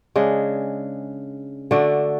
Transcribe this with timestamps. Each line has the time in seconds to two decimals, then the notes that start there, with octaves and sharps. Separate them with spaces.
0.15 C#3 G#3 D4
1.71 D3 A3 D4 F#4